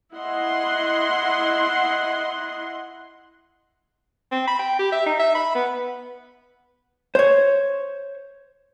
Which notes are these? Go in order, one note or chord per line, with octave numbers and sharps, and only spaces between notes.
E4 D#5 F#5 C6
C4
B5
G5
G4
E5
D#4
E5
B5
B3
C5 C#5